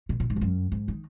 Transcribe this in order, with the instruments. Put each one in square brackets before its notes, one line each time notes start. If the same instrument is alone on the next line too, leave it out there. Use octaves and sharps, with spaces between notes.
[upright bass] B2
A#2
G#2
F2
F#2
G#2
D#3